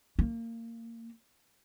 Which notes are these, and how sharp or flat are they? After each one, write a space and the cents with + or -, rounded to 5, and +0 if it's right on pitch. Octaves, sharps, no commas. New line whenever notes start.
A#3 -25